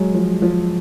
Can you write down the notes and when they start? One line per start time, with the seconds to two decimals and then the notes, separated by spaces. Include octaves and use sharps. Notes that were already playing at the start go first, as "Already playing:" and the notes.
Already playing: F#3 G#3
0.14 F3
0.42 F3